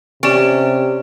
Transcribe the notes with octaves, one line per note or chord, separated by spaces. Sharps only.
C3 C#4 G4 D5 D7